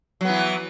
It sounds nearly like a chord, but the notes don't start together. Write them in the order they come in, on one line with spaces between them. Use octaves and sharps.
F#3 B3 E3